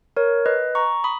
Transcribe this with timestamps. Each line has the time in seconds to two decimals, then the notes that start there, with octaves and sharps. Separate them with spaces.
0.17 A#4 C#5
0.46 B4 D#5
0.75 A#5 C#6
1.04 B5 D#6